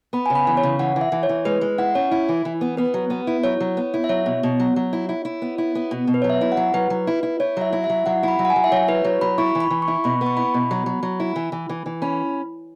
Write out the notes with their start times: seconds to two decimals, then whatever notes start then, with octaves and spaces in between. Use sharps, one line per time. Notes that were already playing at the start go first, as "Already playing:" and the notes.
0.13 B3 B5
0.26 C#3 G#5
0.35 B5
0.47 E3
0.57 C#5
0.63 C#3
0.79 E3 F#5
0.96 E3
1.01 E5
1.12 E3
1.23 C#5
1.29 E3
1.45 G#3 B4
1.61 G#3
1.78 E4 F#5
1.95 C#4 C#5
2.11 E4
2.29 E3
2.45 E3
2.61 B3
2.77 B3 B4
2.94 F#3
3.10 B3
3.27 E4
3.44 F#3 C#5
3.60 F#3
3.77 B3
3.94 E4
4.04 E5
4.09 F#3 C#5
4.26 B2
4.43 B2
4.60 F#3
4.76 F#3
4.93 E4
5.09 E4
5.25 E4
5.42 B3
5.58 E4
5.75 B3
5.91 B2
6.07 B2
6.14 B4
6.22 F#3 C#5
6.30 E5
6.41 E4
6.52 F#5
6.57 F#3
6.74 F#3 B4
6.90 F#3
7.07 E4
7.23 E4
7.40 E4 C#5
7.57 F#3 E5
7.73 E4
7.84 E5
7.90 F#3
8.06 F#3 F#5
8.23 E4 B5
8.39 F#3
8.45 F#5
8.50 G#5
8.56 F#3
8.64 E5
8.72 F#3 C#5
8.88 E4 B4
9.04 F#3 C#5
9.21 F#3 B5
9.38 E4 C#6
9.55 E3
9.60 B5
9.70 E3
9.82 C#6
9.88 E4
10.04 B2 B5
10.21 B3
10.26 C#6
10.37 E4 B5
10.54 B2
10.71 F#3
10.86 F#3
11.03 F#3
11.20 E4
11.36 E3
11.52 E3
11.69 E3
11.86 E3
12.02 C#4 B5